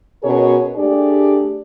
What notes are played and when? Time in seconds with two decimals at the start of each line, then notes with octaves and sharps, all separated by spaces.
0.23 B2 C#4 G#4 A#4 C#5
0.76 A3 D4 G4 G#4 D5